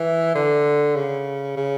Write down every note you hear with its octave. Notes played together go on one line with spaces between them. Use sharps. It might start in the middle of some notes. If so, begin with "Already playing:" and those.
Already playing: E3
D3
C#3
C#3